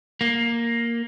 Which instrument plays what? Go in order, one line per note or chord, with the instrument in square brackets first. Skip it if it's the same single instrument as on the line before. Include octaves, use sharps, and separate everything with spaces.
[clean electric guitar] A#3